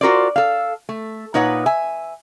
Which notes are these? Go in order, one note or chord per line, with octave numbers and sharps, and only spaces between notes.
F4 F#4 A#4 C5 D5
A4 F5
A3
A#2 D#4 B4 C#5 F#5
E5 G#5